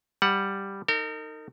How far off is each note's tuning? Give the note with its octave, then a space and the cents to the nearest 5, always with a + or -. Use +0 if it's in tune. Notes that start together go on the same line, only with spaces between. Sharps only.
G3 +0 F#5 +0
D#4 +0 A#4 -40